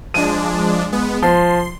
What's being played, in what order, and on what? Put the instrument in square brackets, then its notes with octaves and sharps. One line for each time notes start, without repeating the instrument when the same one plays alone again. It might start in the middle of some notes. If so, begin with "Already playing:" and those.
[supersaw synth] F3 G#3 D4 [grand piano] D#7
[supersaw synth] G#3 B3
[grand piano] F3 [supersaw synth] C6